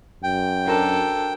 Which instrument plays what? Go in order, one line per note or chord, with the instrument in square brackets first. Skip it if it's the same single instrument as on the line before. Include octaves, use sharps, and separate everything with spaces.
[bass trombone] F#2 [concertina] G5
[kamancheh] D4 A4 [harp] F#4 A#4 C5